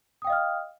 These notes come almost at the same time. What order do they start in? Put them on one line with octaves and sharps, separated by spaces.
D#6 G5 F5 D#5 F6